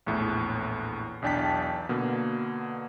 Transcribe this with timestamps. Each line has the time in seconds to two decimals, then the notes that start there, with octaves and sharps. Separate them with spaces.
0.06 A#1 E2 A2
1.22 B1 E2 D4 G5 A5 B6
1.89 B2 D3 A#3